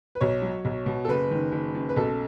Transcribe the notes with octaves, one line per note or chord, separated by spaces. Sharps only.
B4
B1 C#5
F#3
B1
B2
A4
F#1 B4
D#3
F#1
F#2
B4
B1 A4